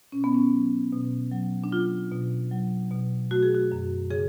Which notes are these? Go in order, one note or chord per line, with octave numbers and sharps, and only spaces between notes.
B2 C#4
B3
C#4
F#3
B2
F#3
D4
F#3 F4
B2
F#3
B2
A3 F#4
G#4
F#4
F#2
C#3 G#4